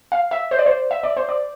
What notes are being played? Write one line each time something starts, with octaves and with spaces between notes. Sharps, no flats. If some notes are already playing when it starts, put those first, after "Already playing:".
F5
E5
C5
D5
C5
E5
D5
C5
D5